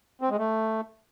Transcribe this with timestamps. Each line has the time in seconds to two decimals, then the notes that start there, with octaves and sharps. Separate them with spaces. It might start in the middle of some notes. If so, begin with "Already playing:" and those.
0.21 C4
0.30 G#3
0.38 A3